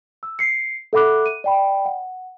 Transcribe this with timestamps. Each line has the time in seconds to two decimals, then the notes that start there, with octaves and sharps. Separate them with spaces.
0.23 E6
0.39 C7 C#7
0.93 A4 E5 F#5 B5 D6 F#6
1.26 D#7
1.44 D5 G5 B5
1.85 F#5